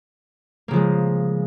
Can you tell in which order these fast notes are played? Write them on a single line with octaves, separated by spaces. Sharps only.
A#3 C#3 F3 G#3